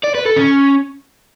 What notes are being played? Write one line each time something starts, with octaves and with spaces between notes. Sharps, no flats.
D5
B4
A4
C#4